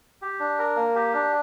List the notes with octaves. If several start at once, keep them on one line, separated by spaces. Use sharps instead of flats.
G4
D4
A#4
A#3
G4
D4